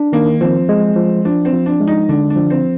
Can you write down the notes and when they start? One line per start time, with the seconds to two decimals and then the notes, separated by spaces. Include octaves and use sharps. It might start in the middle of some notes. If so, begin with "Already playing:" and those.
Already playing: D4
0.13 D#3 A#3
0.41 F3 C4
0.69 G#3
0.96 F3
1.25 F3 D4
1.45 C4
1.53 F3
1.66 D4
1.80 G#3
1.87 D#4
2.09 D3 D4
2.30 D4
2.36 F3
2.50 C4